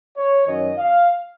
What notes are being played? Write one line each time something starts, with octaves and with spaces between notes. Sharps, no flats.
C#5
F#2 D#3 F#3 C#4 D#5
F5